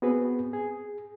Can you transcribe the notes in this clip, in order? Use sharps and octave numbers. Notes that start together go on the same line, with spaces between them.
B3 C4 F#4 G#4 B4
G#4